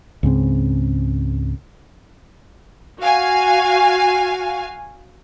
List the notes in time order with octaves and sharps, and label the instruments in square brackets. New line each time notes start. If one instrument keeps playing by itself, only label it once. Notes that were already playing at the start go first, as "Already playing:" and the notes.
[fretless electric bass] C#2 G#2 C#3 C4
[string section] F#4 F5 G#5